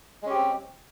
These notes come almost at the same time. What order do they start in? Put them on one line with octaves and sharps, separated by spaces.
G#3 C#4 G4 C4